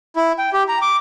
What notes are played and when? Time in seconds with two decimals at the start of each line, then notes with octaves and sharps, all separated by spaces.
0.16 E4
0.38 G5
0.53 G4
0.69 A#5
0.82 D6